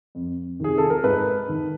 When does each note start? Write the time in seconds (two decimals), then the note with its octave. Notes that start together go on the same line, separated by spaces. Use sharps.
0.15 F2
0.60 C3 D#3 G#4
0.78 A4
0.90 A#4
1.04 G#2 B4
1.49 D#3